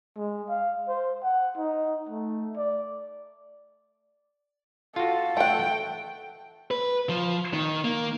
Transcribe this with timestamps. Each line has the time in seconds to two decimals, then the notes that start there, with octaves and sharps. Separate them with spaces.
0.17 G#3
0.49 F5
0.88 C5
1.24 F#5
1.57 D#4
2.09 A3
2.57 D5
4.96 F4 F#4 A4
5.37 A3 F#5 G5
6.71 B4
7.09 F3
7.53 D#3
7.84 A#3